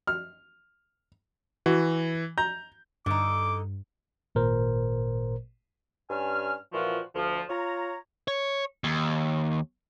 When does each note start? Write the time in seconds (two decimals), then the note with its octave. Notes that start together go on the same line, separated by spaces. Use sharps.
0.07 F6
1.66 E3 F#4
2.38 A#5 G6
3.06 G2 D3 D#4 D6
4.35 G#1 A#2 A#4 C5
6.09 G2 C#4 G#5 F6
6.73 A#2 E3 F3 F4 F#4
7.15 D2 F3
7.49 F4 C#5 A#5
8.28 C#5
8.84 D#2